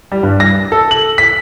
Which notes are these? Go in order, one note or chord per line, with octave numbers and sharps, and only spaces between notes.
G3
G2
A#6
A4
F#7
B6